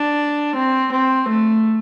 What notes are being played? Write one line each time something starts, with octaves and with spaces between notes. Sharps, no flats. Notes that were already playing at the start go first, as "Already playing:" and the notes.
Already playing: D4
C4
C4
A3